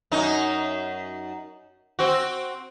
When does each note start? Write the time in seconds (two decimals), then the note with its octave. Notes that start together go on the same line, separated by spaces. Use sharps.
0.11 F#2 D#4
1.99 C4 F#4